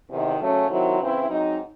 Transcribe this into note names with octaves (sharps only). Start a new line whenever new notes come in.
E2 C3 D#3
C#3 F#3 A3 C#4
C3 D#3 F#3 C4 E4
C#3 E3 C4 E4
G#2 F#3 C4 D#4